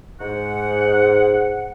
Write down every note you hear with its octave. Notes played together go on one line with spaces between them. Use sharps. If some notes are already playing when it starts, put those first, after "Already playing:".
G#2 F#5